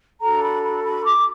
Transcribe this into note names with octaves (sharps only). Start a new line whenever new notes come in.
D4 F#4 A4 A#5
B5
B5
B5
D6